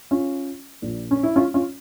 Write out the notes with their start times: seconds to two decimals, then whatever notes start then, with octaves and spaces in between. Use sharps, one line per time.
0.11 C#4 F4
0.82 A#1 A#2
1.11 C#4
1.23 E4
1.36 C#4 F4
1.54 C#4 F4